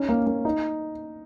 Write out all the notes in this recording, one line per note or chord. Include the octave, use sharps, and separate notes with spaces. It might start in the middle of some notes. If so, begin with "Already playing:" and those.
Already playing: C#4 D#4
A#3
A#3
D#4